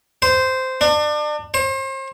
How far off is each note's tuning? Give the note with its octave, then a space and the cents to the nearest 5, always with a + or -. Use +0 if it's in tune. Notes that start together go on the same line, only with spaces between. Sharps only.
C5 -10
D4 +35
C5 +40